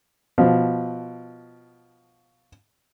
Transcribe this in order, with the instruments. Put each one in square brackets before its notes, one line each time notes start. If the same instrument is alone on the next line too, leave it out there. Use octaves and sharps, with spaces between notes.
[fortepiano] B2 F3